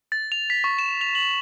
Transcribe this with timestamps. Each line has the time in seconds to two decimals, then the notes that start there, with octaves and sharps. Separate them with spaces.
0.12 A6
0.32 F7
0.50 B6
0.64 C#6
0.79 E7
1.01 F7
1.15 F#7